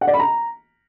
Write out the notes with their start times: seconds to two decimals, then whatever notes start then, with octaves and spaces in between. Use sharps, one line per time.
0.01 F#5
0.07 D5
0.14 B5
0.20 A#5